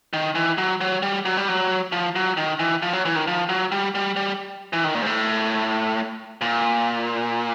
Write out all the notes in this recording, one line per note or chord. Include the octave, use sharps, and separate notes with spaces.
D#3
E3
F#3
F#3
G3
F#3
G3
F#3
F3
F#3
D#3
E3
F3
F#3
E3
D#3
F3
F#3
G3
G3
G3
E3
D#3
A#2
G#2
A2
A#2